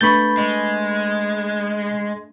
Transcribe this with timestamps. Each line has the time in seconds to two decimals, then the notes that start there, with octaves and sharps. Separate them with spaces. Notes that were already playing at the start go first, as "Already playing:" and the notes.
0.01 A3 D4 B4 B5 C#6 G6 A6
0.37 G#3